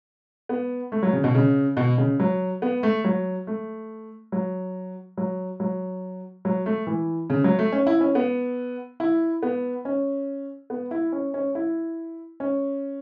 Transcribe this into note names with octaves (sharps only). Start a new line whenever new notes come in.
B3
A3
F#3
C#3
B2
C#3
B2
C#3
F#3
B3
A3
F#3
A3
F#3
F#3
F#3
F#3
A3
E3
C#3
F#3
A3
C#4
E4
C#4
B3
E4
B3
C#4
B3
E4
C#4
C#4
E4
C#4